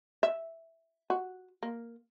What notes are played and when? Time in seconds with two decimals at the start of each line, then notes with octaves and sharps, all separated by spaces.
0.23 E5
1.10 F#4
1.63 A#3